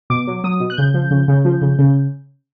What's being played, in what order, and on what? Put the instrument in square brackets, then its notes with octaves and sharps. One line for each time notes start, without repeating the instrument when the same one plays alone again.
[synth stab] B2 D6
F#3
F#3 D#6
B2
F#6
C#3 G6
F3
C#3
C#3
F3
C#3
C#3